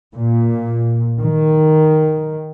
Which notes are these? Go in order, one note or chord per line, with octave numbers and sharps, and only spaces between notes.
A#2
D#3